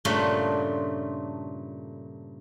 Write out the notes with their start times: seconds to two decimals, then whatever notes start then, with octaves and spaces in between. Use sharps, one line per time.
0.05 G2 A#2 C#3 A3 D4 F4